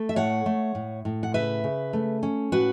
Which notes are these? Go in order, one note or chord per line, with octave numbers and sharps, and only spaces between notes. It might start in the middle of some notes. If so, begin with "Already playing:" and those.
Already playing: A3
E5
A2 C#5 F#5
A3
A2
A2
F#5
C#3 B4 E5
C#3
A3
C#4
A2 F#4 B4